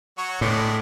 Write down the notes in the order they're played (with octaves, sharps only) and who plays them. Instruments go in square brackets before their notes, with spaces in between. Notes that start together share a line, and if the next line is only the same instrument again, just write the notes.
[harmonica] F#3 F#4 C#5
[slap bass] A2 [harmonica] G#3 B3 D4